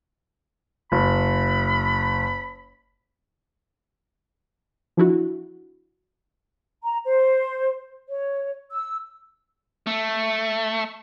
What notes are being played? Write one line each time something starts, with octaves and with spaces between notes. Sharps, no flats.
F#1 B5
F3 D4 E4 F#4
A#5
C5
C#5
E6
A3